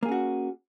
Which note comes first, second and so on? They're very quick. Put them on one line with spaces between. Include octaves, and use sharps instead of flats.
A#3 G#4 C#4 F#4